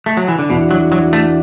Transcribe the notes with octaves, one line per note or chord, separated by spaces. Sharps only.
A3
F#3
E3
D3
E2 B2 E3 D4 F#4
F#3
F#3
A3